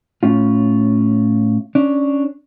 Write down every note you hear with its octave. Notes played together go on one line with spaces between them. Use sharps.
A2 C#4 F4
C#4 D4